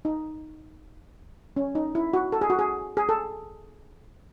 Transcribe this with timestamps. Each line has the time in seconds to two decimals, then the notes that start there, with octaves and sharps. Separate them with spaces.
0.05 D#4
1.56 C#4
1.75 D#4
1.95 E4
2.13 F#4
2.32 A4
2.41 G#4
2.50 F#4
2.59 G#4
2.97 G#4
3.09 A4